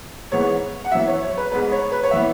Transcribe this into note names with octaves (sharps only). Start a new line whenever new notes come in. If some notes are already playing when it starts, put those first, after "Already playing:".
G#2 E3 G#3 B3 C#5
F#5
F#2 E3 B3 E5
C#5
C#5
B4
G#2 G#3 B3 B4
C#5
B4
C#5
E3 B3 E5